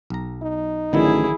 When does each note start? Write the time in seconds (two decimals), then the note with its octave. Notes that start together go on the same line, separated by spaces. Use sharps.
0.10 B1 A#5
0.42 D#4
0.93 A1 D3 D#3 F#3 E4 G#4